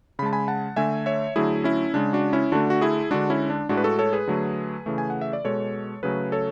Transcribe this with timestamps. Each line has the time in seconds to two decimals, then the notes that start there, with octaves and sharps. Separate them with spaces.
0.19 C#3 B5
0.23 G#3 A5
0.33 G#5 B5
0.48 F#5 A5
0.76 D3 A3 E5 G#5
1.06 C#5 E5
1.36 D3 F#3 A3 E4 G#4
1.64 C#4 E4
1.94 C#3 G#3 D4
2.13 D4 F#4
2.33 C#4 E4
2.52 D3 A3 D4 F#4
2.70 F#4
2.81 E4 G#4
3.11 D3 G#3 D4 F#4
3.30 C#4 E4
3.50 D4
3.69 A2 G#3 D4 F#4
3.77 B4
3.84 F#4 A4
3.99 A4 C#5
4.13 G#4 B4
4.27 D3 F#3 A3
4.86 C#3 E3 A3
4.98 G#5
5.10 F#5
5.21 E5
5.33 D5
5.45 B2 G#3 A4 C#5
6.03 C#3 F#3 A3 G#4 B4
6.32 A4 C#5